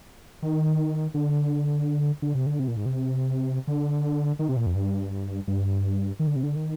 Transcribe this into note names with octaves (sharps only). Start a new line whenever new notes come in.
D#3
D3
D3
C3
D3
C3
A#2
G#2
C3
D3
D#3
C3
A#2
F2
G2
G2
D#3
D3
C3
D3
D#3